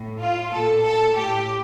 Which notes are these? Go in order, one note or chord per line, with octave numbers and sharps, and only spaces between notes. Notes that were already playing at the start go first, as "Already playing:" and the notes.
Already playing: A2
F4
A#2 A4
A4
A2 G4